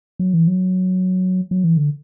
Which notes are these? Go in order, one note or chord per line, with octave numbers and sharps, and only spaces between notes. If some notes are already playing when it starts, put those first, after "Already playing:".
F#3
E3
F#3
F#3
E3
D3